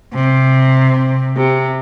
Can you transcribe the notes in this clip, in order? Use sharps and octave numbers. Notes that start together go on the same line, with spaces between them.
C3
C3